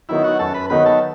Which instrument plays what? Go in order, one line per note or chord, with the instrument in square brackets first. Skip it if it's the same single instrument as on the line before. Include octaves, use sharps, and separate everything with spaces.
[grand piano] D#3 F#3 B3 D#4 [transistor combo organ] E4
[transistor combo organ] F#4
[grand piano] F#2 [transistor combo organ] A4
[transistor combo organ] B4
[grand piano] D#3 F#3 B3 D#4 [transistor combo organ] B4
[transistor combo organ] A4